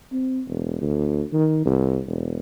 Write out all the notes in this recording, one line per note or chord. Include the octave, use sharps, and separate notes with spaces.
C4
E1
D2
D#3
C2
E1